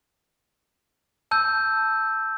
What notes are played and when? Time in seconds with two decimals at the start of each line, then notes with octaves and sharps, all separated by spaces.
1.31 A5 E6 G6